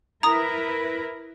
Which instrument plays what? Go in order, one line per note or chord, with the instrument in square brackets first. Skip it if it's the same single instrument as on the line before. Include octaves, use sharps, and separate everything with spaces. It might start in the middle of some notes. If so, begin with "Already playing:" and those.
[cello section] E4 A#4 B4 [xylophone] A#5 D#6